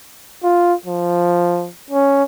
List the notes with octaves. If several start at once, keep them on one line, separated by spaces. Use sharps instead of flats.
F4
F3
C#4